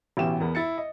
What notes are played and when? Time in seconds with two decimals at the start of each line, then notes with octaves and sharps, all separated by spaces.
0.17 A1 B2 E3 G4 E7
0.40 E2 B3 A#4
0.55 E4 A6 C#7
0.78 D#5